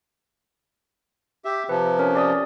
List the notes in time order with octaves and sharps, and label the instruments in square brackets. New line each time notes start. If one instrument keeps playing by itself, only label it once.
[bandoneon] G4 E5
[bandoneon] C3 F3 [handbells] B4
[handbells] C#4 A#4 C#5
G4 D5 D#6